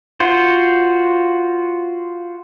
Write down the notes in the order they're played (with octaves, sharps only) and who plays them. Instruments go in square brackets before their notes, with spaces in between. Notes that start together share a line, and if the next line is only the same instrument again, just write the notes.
[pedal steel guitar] F4 F#4 C5